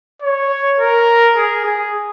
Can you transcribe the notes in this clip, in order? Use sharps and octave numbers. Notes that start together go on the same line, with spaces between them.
C#5
A#4
G#4
G#4